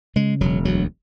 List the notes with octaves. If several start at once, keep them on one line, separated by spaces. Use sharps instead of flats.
C#3 G#3
E1 F#3
D2 F#3